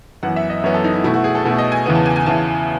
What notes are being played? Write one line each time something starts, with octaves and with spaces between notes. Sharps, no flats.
F#2 E3 B3 F#5
E5
D#5
F#2 E3 B3 C#5
A4
D#4
E4
B2 A3 E4
F#4
G#4
A4
B2 A3 F#4
D#5
G#5
E2 C#3 E3 B3
A5
G#5
G#5
E2 C#3 E3 B3 A5